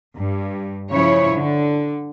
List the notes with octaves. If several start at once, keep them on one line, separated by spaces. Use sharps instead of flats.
G2
C#3 F3 E4 C#5
D3